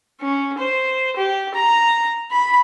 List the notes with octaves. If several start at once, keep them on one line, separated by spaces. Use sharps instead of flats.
C#4
C5
G4
A#5
B5